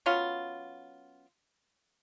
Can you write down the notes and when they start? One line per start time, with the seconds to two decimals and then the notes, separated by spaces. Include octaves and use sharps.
0.06 F#3 B3 C#4 F4